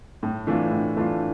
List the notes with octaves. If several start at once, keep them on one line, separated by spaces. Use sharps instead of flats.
A2
E3 A3 D4 F4
A2
E3 A3 D4 F4